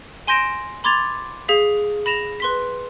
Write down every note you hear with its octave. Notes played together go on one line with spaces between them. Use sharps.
G#5 C6 G6 A#6 D7 E7
B5 C6 D6 G#6 A6 F7
G#4 F5 B6
B5 A#6 E7 F7
B4 C6 B6